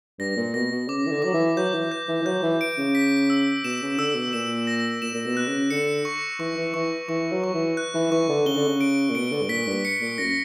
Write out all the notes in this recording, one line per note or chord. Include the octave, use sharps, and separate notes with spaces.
G2 A#6
A#2
B2 A#6
B2
C#3 D6
E3
D3
F#3 D6
E3
F#3 G6
E3
G6
E3
E3
F#3 G6
E3
D7
C#3
B6
E6
B2 E7
C#3
D3 E6
B2
A#2 E7
A#6
A#2 E7
A#2
B2
F#6
C#3
D3 C#7
C#6
E3 C#6
E3
E3 C#6
E3 C#6
F#3
C#6
E3
F#6
E3
E3 C#6
D3
C#3 G7
D3
C#3
D7
A#2
B2 D7
D3
G2
A#2 B6
G2
C#7
A#2
F#2 A#6